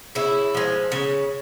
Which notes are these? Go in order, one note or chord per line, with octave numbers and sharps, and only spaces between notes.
C#3 E4
F3 G#3
C#3